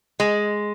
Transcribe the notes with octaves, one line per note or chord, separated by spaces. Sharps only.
G#3